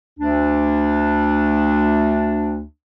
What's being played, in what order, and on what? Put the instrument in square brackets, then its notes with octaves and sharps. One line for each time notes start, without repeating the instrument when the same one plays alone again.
[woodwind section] D2 D4